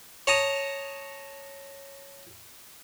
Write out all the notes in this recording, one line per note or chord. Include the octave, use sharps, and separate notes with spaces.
C#5 A5 A#5 D#6